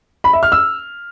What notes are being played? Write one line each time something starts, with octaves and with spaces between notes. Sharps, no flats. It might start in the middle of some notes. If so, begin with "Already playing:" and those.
B5
E5
F6
E6